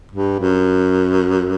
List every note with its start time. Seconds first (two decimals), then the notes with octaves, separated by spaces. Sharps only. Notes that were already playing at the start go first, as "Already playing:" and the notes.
0.12 G2
0.40 F#2